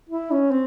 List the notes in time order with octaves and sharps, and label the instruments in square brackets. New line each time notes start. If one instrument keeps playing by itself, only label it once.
[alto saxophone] E4
C#4
C4